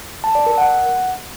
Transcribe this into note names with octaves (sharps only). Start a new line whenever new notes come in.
A5
D5
A#4
F#5